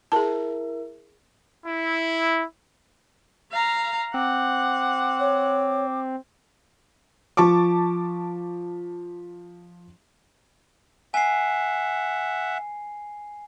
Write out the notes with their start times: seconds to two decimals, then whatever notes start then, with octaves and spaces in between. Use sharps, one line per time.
0.12 E4 G#4 A#4 E5 A5
1.66 E4
3.52 F5 A#5
4.14 C4 F#5 D6
5.20 C#5
7.37 F3 A5 C#6 D6
11.14 E5 F#5 G#5 C7